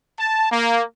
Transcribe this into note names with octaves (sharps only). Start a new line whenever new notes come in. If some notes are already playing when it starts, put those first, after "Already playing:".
A5
A#3